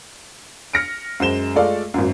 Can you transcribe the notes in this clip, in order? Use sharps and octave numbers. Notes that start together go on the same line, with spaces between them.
F6 A#6 C#7 D7
F#2 G#3 C5 E7 G7
G#3 A3 F4 A4 D5 F5
G#1 F#2